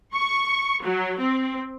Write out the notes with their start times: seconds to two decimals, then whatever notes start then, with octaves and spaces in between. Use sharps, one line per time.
0.15 C#6
0.83 F#3
1.21 C4